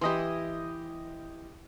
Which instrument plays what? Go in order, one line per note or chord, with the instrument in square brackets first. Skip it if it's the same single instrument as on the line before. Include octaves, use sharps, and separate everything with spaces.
[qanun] E3 E4 [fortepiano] G4 D#5 C6